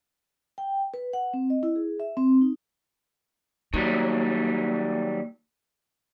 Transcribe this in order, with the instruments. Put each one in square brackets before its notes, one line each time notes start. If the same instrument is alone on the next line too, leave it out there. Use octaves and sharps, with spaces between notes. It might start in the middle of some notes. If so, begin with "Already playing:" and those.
[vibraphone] G5
B4
F#5
C4
D#5
E4
G#4
E5
C4
D#4
[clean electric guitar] D#3 F#3 G3 [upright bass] A#3